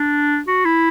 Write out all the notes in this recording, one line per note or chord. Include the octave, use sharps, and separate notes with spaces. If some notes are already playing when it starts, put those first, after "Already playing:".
Already playing: D4
F#4
E4